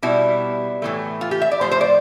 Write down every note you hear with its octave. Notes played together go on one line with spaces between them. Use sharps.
B2 G3 E4
A2 E3 A3
F4
G4
E5
D5
A2 F3 A3 C5
C5
D5